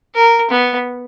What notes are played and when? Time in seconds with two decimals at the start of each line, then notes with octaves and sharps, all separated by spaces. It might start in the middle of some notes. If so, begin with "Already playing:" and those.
0.15 A#4
0.51 B3